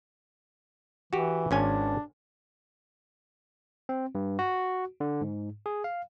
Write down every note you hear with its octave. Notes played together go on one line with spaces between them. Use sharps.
E3 F#4 G4
G#1 C#4 D4 G#5
C4
G2
F#4
D3
G#2
G#4
F5